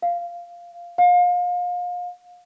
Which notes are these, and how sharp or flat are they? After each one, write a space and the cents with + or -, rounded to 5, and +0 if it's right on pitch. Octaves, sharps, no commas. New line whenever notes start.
F5 -10
F5 +30